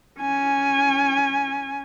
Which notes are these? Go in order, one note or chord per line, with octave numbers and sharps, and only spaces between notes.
C#4 G#5